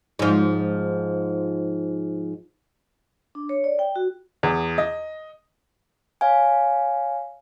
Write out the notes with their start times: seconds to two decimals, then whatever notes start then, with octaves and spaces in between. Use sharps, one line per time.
0.19 G#2 F3
3.35 D4
3.49 C#5
3.64 D5
3.79 G5
3.96 F#4
4.43 E2
4.78 D#5
6.21 C#5 F5 G#5